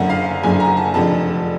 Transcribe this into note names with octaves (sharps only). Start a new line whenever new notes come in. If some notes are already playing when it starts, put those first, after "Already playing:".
Already playing: F#1 F#2 D3 F#5
F5
F#1 F#2 D3 G#5
A#5
A5
F1 F2 D3 A5